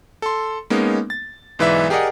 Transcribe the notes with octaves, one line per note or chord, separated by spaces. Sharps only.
A4 C6
G#3 A#3 B3 C#4 D#4
A6
B1 G#2 E3 B4 D5 E5
G4 G#4 A#4 D5 D#5 F#5